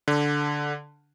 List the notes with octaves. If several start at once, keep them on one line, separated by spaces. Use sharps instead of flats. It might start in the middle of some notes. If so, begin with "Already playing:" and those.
D3